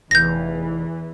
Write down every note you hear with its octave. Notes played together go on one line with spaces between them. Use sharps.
F1 E2 E3 G6 A#6